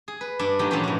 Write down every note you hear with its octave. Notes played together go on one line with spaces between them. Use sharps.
G#4
B4
G2 D4 E5
D#3 F#3 A3 G4
A#2 E3 F3 A3 C#4
G#2 F#4